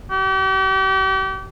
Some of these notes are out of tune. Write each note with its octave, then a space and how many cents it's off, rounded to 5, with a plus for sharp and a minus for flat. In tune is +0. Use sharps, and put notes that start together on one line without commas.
G4 -40